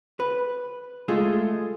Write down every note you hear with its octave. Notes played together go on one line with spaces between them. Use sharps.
B4
G#3 A3 F4 G#4